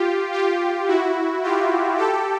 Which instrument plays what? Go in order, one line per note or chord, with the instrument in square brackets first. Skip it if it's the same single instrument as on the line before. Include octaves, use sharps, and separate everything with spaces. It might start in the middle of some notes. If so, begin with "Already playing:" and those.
Already playing: [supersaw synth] F4 G4
F4 G4
E4 F#4
F4 G4
G4 A4